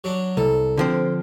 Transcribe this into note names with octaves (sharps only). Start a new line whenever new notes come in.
F#3 D4
C2 A4
D3 F3 C4